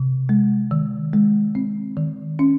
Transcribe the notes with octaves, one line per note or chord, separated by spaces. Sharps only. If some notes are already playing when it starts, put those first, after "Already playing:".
Already playing: C3
G#3
D#3
G#3
C4
D#3
C#4